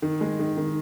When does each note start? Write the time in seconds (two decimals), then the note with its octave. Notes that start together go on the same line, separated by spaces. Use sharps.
0.02 D#3
0.21 G#3
0.39 D#3
0.57 D#3